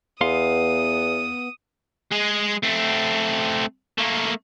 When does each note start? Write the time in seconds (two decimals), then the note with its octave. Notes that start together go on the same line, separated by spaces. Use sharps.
0.21 E2 B3 F5 C6 D#6
2.11 G#3 G#4
2.63 A3 C4
3.98 A3 A#3